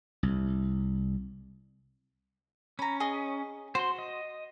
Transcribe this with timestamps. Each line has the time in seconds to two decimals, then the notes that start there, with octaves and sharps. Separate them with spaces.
0.23 C2
2.79 C#4 A#5 B5
3.00 G#4 D#5
3.75 F#4 C5 C6
3.98 D#5